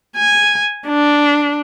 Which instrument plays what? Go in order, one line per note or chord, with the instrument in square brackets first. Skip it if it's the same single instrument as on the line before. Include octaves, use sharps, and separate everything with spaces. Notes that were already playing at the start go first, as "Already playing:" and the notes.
[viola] G#5
D4